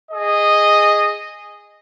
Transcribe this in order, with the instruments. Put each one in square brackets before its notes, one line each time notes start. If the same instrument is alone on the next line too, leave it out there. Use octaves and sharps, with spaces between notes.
[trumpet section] G#4 D#5